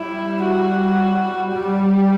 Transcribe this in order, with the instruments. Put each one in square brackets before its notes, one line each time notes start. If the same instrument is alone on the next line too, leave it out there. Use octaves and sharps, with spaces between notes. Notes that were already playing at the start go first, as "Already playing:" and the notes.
Already playing: [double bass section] G3 [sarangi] E4
[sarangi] F#4
[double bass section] G3 [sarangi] G4